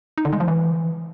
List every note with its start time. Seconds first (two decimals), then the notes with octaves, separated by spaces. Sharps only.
0.18 D#4
0.25 D3
0.33 G#3
0.40 F3
0.48 E3